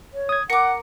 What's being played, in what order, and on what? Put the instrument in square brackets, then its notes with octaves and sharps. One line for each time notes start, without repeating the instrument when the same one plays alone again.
[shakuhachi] C#5
[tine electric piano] D#6 G#6
[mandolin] A#4 D6 [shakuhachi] F#5 [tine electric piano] C#7